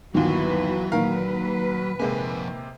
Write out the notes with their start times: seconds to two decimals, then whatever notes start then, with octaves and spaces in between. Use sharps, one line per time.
0.15 G1 D#2 A#2 D#3 E3 F#3 F#4 B4
0.92 A#2 D#3 A#4 B4 F5
2.00 F2 C3 G#3 A#3 G#5